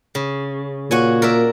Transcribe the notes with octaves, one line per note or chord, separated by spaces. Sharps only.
C#3
A#2 F#4 C#5 G#5
A#4 D5 E5